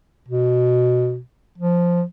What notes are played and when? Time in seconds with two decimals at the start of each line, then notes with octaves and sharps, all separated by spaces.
0.28 B2
1.58 F3